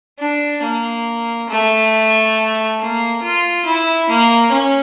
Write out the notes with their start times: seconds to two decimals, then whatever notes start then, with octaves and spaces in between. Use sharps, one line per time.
0.19 D4
0.63 A#3
1.49 A3
2.80 A#3
3.22 F4
3.66 E4
4.09 A#3
4.52 C#4